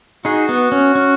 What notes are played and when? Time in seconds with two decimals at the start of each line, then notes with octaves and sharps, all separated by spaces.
0.25 D#4 F#4 G#4
0.49 B3
0.72 C#4
0.95 C#4